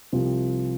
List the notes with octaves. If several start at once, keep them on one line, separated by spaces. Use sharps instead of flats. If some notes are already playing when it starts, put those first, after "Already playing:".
C2 C3 F3